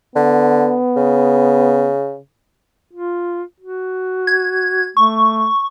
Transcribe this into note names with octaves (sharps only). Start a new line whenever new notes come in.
D3 B3
C#3
F4
F#4
G#6
A3 C#6